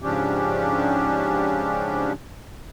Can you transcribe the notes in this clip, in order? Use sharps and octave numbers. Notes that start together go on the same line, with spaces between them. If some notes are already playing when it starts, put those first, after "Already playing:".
G#2 C#3 F3 C#4 D4 G4